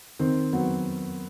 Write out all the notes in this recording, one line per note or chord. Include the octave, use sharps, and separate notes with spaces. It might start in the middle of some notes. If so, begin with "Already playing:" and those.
D#3 C4
F#3 B3